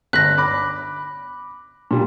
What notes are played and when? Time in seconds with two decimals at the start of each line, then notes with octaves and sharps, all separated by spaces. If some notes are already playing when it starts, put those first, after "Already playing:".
0.13 G1 F#6 A#6 B6 F#7
0.38 B5 D6
1.91 A#2 G3